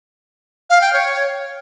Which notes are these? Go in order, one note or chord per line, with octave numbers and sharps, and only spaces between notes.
F5
G5
C#5